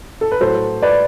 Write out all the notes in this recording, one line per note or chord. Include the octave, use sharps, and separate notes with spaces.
A4
B4
A2 F#3 A4 C5
B4 D5